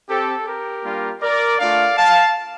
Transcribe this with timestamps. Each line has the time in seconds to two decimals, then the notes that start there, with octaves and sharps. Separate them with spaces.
0.08 C4 G4 A4
0.46 G4 A#4
0.84 G3 A#3 D4 F4
1.21 A#4 D5
1.59 A3 D4 F4 D5 F5
1.97 F5 A5